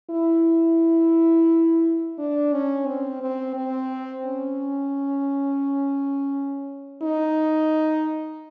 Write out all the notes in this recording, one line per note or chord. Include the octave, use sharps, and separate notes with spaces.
E4
D4
C#4
C4
C4
C4
C#4
D#4